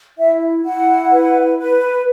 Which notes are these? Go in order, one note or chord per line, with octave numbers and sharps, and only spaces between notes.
E4 E5
E4 F#5
B4
B4